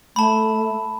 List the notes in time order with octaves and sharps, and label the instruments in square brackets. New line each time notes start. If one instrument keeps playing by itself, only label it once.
[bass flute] A3 [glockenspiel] A5 B5